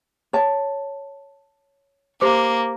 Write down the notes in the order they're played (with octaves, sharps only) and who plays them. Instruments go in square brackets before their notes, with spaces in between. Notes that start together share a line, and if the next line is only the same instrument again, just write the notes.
[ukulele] C#5 A5
[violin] A#3 [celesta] G4 C5 D6